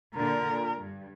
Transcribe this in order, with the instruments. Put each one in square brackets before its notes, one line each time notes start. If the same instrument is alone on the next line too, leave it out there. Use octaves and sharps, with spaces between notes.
[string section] A#2 D3 [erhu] A#4
[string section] A#2
G2